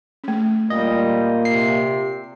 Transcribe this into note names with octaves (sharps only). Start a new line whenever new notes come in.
A3 C#4
A#2 G3 D#5
C3 C7